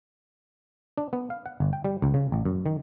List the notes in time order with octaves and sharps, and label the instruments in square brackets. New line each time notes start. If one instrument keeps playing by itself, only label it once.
[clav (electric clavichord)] D4
B3
F5
F#5
G1
G5
G3
C#2
C#3
A1
F#2
D#3